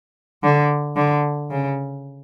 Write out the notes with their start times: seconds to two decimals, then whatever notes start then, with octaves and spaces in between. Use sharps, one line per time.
0.43 D3
0.96 D3
1.50 C#3